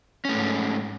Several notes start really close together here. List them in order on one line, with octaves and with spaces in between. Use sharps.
C#4 A3 G#2